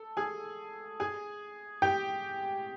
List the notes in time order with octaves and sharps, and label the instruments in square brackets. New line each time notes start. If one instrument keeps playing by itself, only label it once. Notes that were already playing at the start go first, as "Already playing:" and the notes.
Already playing: [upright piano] A4
G#4 G#5
G#4 G#5
G4 G5